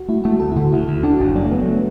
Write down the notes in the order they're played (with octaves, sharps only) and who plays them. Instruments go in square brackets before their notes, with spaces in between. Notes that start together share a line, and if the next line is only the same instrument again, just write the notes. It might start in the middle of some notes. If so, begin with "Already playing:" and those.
Already playing: [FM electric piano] F#4
[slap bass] A3 [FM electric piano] E4
[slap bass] A3 [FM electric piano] F#4
[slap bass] D2 [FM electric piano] A4
[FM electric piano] E4
[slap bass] D3 [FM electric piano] F#4
[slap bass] D2 [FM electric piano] E4
[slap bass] D2 [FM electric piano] E4
[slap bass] D4 [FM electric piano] F#4
[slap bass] F#1 [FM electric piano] F#4
[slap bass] F#3 [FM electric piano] D4
[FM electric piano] A3
[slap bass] F#3 [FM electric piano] B3
[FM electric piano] A3